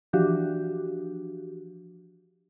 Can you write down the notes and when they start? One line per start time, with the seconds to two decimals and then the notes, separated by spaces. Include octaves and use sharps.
0.13 E3 F3 D4 F#4 G4